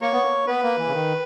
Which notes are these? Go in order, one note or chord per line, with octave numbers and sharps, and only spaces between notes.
A#3 A#4 C#5
B3
A#3
B3 B4
A#3
E3
C#3
D#3